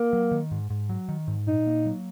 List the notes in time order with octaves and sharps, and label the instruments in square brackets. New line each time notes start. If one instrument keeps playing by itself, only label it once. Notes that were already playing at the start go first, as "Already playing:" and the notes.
Already playing: [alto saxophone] A#3
[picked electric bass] F#3
D#3
G#2
G#2
F#3
D#3
G#2
[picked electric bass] A#2 [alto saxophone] D#4
[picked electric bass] A#3
F#3